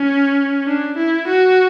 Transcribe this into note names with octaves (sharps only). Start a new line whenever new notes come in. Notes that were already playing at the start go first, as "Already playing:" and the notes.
Already playing: C#4
D4
E4
F#4